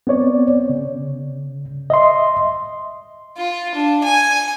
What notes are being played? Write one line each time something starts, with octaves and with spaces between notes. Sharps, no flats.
B3 C4 C#5 D5
C#3
D#5 E5 C6
F4
D4
G#5